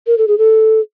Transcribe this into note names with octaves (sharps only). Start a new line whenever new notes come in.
A#4
A4
G#4
A4